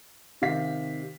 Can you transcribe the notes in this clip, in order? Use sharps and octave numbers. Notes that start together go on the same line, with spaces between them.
C3 D#3 F5 B6